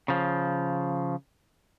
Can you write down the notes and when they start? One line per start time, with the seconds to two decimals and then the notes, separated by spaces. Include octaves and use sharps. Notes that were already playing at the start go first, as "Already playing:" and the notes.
0.08 C#3 F3